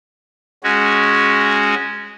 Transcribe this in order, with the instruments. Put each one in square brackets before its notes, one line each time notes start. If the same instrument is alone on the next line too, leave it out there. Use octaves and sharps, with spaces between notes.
[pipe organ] G#3 C#4 F#4